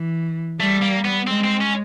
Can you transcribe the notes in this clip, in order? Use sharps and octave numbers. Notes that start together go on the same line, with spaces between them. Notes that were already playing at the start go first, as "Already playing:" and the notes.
Already playing: E3
G3 A3
A#3
B3
G#3 C4
C4
C#4